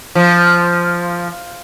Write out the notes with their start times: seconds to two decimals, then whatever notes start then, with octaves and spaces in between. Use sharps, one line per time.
0.15 F3